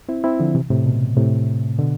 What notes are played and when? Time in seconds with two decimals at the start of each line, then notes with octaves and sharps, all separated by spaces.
0.09 C4 E4
0.24 C4 E4
0.40 D3 F3
0.55 C3 E3
0.70 A2 C3
0.86 B2
1.17 A2 C3
1.79 B2 D3